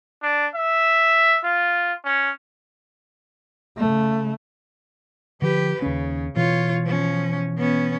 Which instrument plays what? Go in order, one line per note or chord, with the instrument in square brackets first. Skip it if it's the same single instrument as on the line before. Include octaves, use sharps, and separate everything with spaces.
[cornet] D4
E5
F4
C#4
[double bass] C#3 A3
[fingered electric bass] D3 F3 [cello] G4 B4
[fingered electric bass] D#2 C#4 [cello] C#3
[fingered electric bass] B2 E3 [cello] F4 C#5
[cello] F3 C#4
B3 C#4